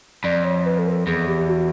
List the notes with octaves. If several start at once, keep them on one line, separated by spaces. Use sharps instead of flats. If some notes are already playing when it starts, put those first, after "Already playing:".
F2 D5
C#5
B4
A4
A#4
A4
E2 G#4
G4
F#4